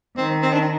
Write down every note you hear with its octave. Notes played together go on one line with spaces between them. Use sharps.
D#3 C4
C4
D4